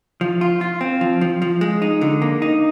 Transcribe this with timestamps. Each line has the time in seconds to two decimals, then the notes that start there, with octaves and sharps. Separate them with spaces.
0.21 F3
0.41 F4
0.61 F4
0.81 C4
1.01 F3
1.21 F3
1.42 F3
1.61 G#3
1.82 D#4
2.01 D3
2.22 A#3
2.42 D#4